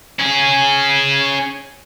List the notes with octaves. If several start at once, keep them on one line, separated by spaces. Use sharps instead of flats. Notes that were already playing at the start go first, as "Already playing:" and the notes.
C#4 G#4